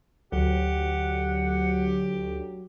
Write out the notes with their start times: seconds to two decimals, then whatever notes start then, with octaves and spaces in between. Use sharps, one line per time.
0.32 D2 F#3 G4 F#5